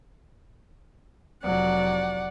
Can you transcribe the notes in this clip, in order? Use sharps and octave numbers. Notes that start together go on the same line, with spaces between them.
F1 F#3 D5 F#5